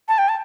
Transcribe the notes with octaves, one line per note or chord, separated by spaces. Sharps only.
A5
G5
A5